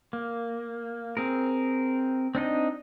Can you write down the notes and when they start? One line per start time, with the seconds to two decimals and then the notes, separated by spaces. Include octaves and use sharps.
0.13 A#3
1.17 C4 G#4 A#4
2.35 C4 D4 D#4 D#5